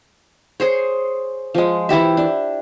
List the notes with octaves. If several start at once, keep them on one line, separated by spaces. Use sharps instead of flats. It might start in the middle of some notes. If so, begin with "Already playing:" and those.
G#4 C5 C#5
F3 G#3
E3 E4 G4 E5
D4